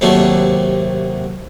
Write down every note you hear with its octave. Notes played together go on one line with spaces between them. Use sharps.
D#2 C3 F#3 A3 D4 A4